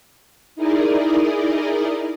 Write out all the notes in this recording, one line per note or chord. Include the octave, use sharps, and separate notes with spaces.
D#4 E4 G#4 A#4 D5 D#5